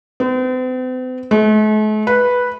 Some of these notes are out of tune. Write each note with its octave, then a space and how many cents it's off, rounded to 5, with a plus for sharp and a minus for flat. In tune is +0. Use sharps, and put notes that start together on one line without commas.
C4 -45
A3 -45
B4 -5